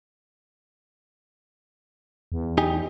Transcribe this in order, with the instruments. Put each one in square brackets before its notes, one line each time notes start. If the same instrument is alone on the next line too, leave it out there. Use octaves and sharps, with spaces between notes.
[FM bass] E2
[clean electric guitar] D#4 G4 G#5